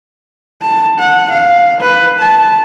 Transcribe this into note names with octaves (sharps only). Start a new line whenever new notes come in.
A5
F#5
F5
B4
A5